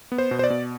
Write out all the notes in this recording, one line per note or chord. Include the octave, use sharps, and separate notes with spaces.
B3
C5
B2
C5
D5
B2